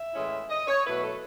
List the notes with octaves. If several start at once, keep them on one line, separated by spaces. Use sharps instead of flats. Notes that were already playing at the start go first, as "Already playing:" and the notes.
Already playing: E5
A2 E3 G#3 C#4 E4
D#5
C#5
B2 F#3 A3 E4 B4
A4